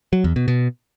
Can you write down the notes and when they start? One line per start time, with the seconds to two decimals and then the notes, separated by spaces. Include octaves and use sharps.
0.13 F#3
0.24 E2
0.36 B2
0.48 B2